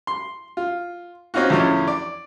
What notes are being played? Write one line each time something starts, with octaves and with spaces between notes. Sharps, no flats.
C6
F4
C4 C#4 D#4 F4 F#4
E2 A2 D3 F3 C#4
D5